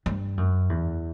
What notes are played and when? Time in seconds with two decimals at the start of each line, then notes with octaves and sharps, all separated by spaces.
0.06 G2
0.37 F#2
0.69 E2